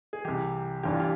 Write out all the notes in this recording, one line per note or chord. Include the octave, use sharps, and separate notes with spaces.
G#4
C2 C3 E3 G4
G1 G2 E3 G3 G4
F4
G4